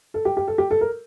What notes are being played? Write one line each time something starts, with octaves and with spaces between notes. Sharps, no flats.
A4
G4
G4
A4
G4
A4
A#4